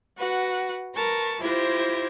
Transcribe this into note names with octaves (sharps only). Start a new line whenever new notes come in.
F#4 B4 F#5
A#4 B4 A5 A#5 C#6
E4 F4 G4 C5 G#6 A#6